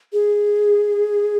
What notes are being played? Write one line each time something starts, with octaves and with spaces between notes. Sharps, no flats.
G#4